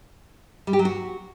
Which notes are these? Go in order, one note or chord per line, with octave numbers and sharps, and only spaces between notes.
G3
G4
F#3
F#4